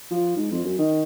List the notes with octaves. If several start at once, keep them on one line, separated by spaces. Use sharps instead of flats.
F3
G#2
F2
F#2
D#3